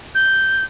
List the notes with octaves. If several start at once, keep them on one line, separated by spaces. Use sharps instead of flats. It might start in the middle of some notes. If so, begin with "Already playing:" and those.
G6